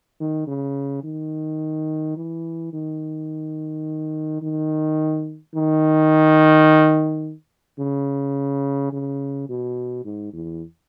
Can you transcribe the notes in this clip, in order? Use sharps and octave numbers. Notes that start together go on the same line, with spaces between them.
D#3
C#3
D#3
E3
D#3
D#3
D#3
C#3
C#3
B2
G#2
E2